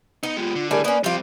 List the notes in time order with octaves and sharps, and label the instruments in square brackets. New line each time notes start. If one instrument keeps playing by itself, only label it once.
[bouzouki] B3 [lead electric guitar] D#4
[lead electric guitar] G#3 G4 [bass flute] F4
[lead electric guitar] D3
[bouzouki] A2 G3 G#4 [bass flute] A#4
[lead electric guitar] A#3 [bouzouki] B3 C#4 [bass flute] D5
[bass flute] F3 [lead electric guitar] G3 C4 [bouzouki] F4 G4